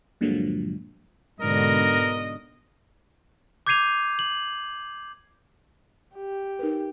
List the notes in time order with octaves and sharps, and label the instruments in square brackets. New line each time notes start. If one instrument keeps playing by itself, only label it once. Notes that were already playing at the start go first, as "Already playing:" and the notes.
[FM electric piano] G2 A#2 D3 F3 F#3 G#3
[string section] G#2 B2 D3 [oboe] A#4 [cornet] D#5
[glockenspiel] D6 G6 G#6 C7 D#7 F7
F#7
[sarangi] G4
[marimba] D#4 A#4 B4